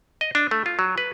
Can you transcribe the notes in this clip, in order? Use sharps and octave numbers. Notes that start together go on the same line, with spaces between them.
D#5
D4
A3
F4
F#3
B4